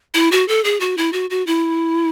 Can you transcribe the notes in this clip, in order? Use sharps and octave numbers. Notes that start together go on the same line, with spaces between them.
E4
F#4
A4
G#4
F#4
E4
F#4
F#4
E4